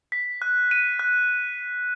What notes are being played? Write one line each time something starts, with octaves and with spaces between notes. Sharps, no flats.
B6
F#6
D#7
F#6